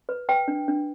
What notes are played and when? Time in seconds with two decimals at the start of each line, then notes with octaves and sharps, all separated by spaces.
0.09 B4
0.29 B4 G5
0.48 D4
0.68 D4